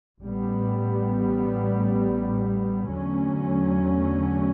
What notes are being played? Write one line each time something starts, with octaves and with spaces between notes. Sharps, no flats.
A1 A2 G3 B3
E2 D3 F#3 A3 C#4